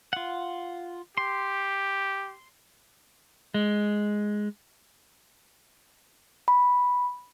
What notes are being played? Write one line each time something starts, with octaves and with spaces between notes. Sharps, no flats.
F4 F#5
G4 C6
G#3
B5